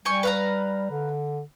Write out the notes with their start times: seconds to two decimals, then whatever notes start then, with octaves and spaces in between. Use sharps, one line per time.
0.05 G3 G5 G#5 C#6
0.23 B4 F5 A#5
0.91 D3